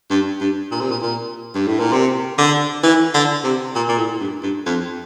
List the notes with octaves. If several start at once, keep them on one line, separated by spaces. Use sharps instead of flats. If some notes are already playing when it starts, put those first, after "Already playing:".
G2
G2
A#2
C3
A#2
A#2
G2
A2
A#2
C3
D3
E3
D3
C3
A#2
A#2
A2
G2
G2
F2